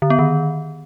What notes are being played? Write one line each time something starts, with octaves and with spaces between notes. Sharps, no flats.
D3
B3
D#3